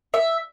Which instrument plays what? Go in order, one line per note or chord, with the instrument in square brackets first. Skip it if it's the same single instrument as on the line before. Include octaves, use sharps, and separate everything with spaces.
[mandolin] E5